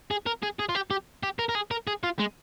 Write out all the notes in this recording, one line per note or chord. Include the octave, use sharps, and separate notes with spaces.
G#4
A#4
G#4
G#4
F4
G4
G4
G4
A#4
A#4
G#4
A#4
G#4
F4
G#3